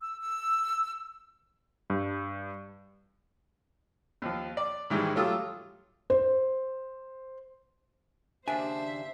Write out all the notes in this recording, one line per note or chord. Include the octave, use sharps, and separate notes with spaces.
E6
E6
G2
D#2 F3
D5
G#2 D#3 E3 G3 G#3
F#3 A3 F4 G4 D#6 E6
C5
D#2 C#3 D4 C5 E5 G#5